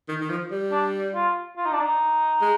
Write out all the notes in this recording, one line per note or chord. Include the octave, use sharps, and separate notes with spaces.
D#3
D#3
F3
G3
D4
F4
F4
D#4
D4
D#4
G#3